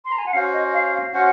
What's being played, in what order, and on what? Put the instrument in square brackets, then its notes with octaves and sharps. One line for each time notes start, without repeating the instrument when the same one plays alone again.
[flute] C6
A#5
G#5
F#5
[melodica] C#4 F#4 C5 [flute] F5
[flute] D#5
F5
F5
[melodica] C#4 F#4 C5 [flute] F#5